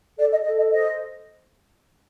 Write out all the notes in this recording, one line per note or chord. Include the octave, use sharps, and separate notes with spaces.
A4 D5
D#5
A4 D#5
D#5
C5 D#5